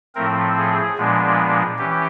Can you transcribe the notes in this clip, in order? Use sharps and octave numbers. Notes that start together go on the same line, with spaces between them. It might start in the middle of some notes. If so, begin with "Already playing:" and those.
A2 F3 A3 C4 A#4
G#4
A#2 F3 G#3 B3 D4
E3 C#4 G4